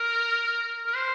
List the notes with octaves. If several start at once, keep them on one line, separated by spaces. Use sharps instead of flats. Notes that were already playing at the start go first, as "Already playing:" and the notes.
Already playing: A#4
A#4
C5